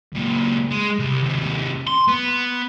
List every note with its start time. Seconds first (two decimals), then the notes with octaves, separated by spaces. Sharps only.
0.13 C#2 A#2
0.71 G#3
0.99 C2
1.24 D#2 C3
1.87 C6
2.08 B3